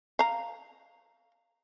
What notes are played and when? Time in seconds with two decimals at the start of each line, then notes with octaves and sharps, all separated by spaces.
0.19 F5 A#5